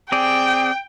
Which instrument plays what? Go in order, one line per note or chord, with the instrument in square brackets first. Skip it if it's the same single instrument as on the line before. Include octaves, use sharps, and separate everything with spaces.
[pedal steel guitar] C4 G#4 D5 [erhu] G5